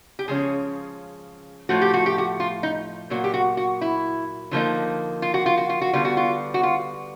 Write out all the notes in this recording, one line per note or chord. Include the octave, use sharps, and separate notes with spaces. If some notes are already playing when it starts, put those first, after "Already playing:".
G4
C#3 F3 G#3 C#4 G#4
A2 F3 A3 F#4
G4
F#4
G4
F#4
F4
D#4
A#2 F#3 A#3 F#4
G4
F#4
F#4
E4
D3 F3 A#3 D#4
F4
F#4
F4
F#4
F4
F#4
D3 G3 B3 F4
F#4
F4
F#4
F4